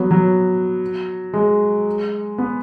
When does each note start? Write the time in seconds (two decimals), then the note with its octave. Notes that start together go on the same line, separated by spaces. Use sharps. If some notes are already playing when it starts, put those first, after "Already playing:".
Already playing: F#3 B3
0.11 F#3
1.33 G#3
2.38 B3